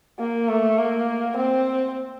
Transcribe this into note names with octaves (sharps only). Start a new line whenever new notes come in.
A#3
A3
A#3
C4